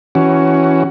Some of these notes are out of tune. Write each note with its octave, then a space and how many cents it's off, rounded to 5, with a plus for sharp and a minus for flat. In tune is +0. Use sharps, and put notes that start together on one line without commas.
E3 -5 C#4 +0 F#4 +15